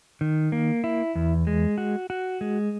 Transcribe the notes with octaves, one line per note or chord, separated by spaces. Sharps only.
D#3
A#3
E4
E2
G#3
F#4
F#4
G#3